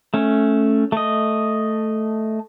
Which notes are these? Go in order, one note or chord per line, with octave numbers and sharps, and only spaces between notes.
A3 C#4
A3 D#5